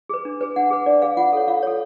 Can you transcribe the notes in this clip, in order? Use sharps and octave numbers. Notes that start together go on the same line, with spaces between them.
G#4 B4
D4
G#4 B4
D4 F#5
G#4 B4
D4 D5
G#4 B4 F5
F4 F#5
A4 C#5
F4 F5
A4 C#5